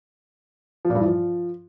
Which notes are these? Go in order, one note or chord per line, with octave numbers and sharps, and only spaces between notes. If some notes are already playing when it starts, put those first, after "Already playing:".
F3
A#2
G2
E3
F3